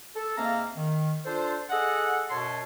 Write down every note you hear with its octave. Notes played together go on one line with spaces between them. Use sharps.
A4
G#2 A#3 C4 E5 F5 A#5
D#3
D4 F4 A4 C5
G#4 A4 D#5 F#5
F#2 B2 C#5 A5 C6